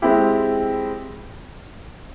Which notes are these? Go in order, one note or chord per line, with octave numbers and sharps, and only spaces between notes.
G#3 C4 E4 G4